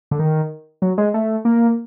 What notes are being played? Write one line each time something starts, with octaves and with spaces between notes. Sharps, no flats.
D3
D#3
F#3
G#3
A3
A#3